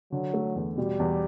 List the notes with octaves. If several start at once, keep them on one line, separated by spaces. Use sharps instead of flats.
D3 F#3
A3
E2
B2 G3
E2